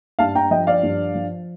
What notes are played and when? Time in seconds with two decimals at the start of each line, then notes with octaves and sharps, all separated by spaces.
0.19 G2 F5 A5
0.35 G5 A#5
0.51 F3 D#5 G5
0.67 D5 F5
0.83 G2
1.15 F3